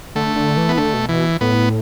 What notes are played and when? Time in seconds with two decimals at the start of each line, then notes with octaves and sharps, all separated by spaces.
0.16 D3 A3
0.36 D3
0.57 E3
0.69 B3
0.77 D3 A3
0.94 B2
1.09 B2 E3
1.41 A2 B3